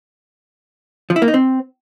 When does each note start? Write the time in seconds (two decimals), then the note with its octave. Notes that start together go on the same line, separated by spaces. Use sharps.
1.10 F3
1.16 E4
1.22 A#3
1.28 D#4
1.34 C4